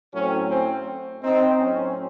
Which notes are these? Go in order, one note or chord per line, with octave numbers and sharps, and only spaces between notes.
A2 F#3 A3 C4 C#4
C4
C4 D#4
A2 F#3 C4 C#4